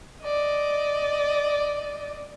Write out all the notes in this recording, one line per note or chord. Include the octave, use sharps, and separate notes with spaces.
D5 D#5